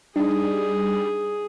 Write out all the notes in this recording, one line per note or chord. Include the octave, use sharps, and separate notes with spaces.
G3 D4 D#4 G#4